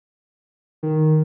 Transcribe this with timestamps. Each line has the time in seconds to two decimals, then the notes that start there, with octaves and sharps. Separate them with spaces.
0.83 D#3